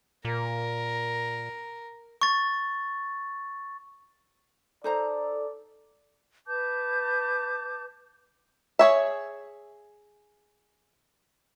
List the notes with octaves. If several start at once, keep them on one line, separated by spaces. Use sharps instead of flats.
A#2 A#4
C#6 A6
D#4 A4 C5 D5 A#5
B4 A5 D6 G6
G#4 C#5 E5